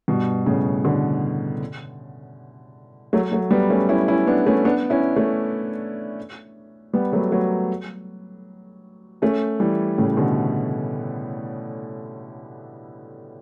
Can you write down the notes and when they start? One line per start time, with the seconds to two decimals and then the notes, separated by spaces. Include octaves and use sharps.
0.08 G2 B2
0.46 A2 C#3
0.84 B2 D3
3.13 F#3 A3
3.32 F#3 A3
3.51 G3 B3
3.70 A3 C#4
3.89 C#4 E4
4.08 C#4 E4
4.27 B3 D4
4.46 A3 C#4
4.65 B3 D4
4.90 C#4 E4
5.16 A3 C#4
6.93 G3 B3
7.13 F#3 A3
7.32 F#3 A3
9.22 A3 C#4
9.60 E3 G3
9.98 A2 C#3
10.17 B2 D3